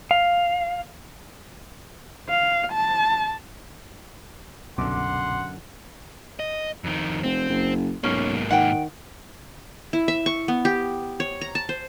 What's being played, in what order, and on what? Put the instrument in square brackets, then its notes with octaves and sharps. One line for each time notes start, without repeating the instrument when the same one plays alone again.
[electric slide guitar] F5
[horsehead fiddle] F5
A5
[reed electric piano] C2 B2 D6 [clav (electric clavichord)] F#2 D3 [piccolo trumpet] F#5 [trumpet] C6
[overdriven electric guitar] D#5
F2 D#3
[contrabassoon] F1 [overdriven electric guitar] C4
[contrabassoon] F#1
[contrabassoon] B1 [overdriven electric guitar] G#2 A#3 [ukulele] C#4
[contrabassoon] D#3 [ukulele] F#5 G5
[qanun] E4
E5
C#6
B3
G4
C#5
A#5
A5
C5